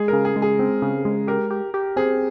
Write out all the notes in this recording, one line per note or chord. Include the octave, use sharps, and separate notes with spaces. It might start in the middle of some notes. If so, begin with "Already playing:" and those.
Already playing: G#3 G#4
C#3 A#4
G#4
G#3
G#4
C4
C#3
G#3
G4 A#4
G4
G4
C4 G#4